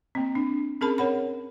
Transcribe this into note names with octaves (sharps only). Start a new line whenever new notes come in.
A#3 C4
D4
C4 C#4 G#4 A#4 A5 B5
A#4 C#5 F#5 B5